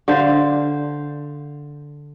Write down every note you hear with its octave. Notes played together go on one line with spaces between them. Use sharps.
D3 C5 F5